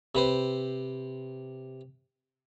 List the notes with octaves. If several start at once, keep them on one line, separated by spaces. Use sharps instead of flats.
C3 B4 C5